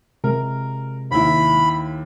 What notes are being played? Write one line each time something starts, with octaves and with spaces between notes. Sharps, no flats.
C3 G#3 A#4
D#2 E4 B5